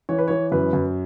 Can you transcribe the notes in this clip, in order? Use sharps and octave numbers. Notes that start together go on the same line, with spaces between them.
E3 C#5
B4
E3 C#5
F#2 B4
F#2